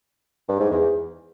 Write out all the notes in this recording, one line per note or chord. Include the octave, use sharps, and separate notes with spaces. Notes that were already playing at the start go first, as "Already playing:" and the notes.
G2
G#2
E2